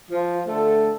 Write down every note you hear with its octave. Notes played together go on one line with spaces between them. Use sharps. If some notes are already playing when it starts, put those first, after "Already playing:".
F3
D3 A3 A4